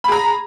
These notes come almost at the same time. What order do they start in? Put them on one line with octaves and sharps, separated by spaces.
B5 G#4 A#5